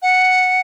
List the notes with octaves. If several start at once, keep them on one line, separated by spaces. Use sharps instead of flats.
F#5